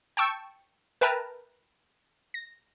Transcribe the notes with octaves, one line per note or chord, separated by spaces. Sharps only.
G5 A5 C#6 E6
A#4 B4 E5 G5 A5 A#5
A#6